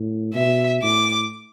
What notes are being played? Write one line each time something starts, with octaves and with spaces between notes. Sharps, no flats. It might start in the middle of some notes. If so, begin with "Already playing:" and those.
Already playing: A2
B2 E5
A2 D6